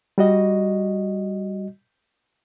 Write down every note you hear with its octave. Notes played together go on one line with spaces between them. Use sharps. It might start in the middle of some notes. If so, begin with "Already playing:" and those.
G3 F#4 D#5